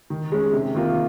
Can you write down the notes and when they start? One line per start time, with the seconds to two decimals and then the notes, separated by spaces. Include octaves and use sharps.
0.10 D#3
0.32 G#3 C#4
0.53 C3
0.75 D#3 A#3 F4 A#4